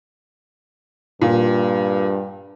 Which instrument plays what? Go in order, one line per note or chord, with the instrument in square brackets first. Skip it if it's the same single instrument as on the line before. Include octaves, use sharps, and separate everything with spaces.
[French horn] G2 [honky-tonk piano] A#2